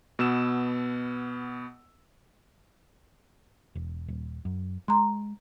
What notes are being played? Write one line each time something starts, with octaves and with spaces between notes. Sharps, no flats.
B2 B3 E6 E7
E1
D#1
F#2
G#3 A#5 C6